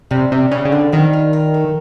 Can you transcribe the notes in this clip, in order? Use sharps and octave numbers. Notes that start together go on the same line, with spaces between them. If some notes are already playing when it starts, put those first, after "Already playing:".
C3 G3
C3 G3
C#3 G3
C#3
D3 C4
D#3 G3
F4
A#4
A3